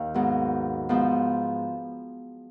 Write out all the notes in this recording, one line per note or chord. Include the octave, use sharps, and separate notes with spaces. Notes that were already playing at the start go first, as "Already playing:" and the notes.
Already playing: D#2 D#3 F5
G#2 F#3 B3
G#2 F3 B3